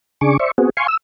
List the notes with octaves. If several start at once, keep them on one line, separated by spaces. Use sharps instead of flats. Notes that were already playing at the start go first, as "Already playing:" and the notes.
C#3 D4 G#4 C#6 D6
C5 D5 E5 C#6
B3 C4 F#4 G#4
F5 G#5 C6 C#6
E6